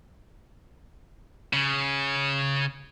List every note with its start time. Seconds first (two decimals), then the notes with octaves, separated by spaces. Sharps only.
1.53 C#3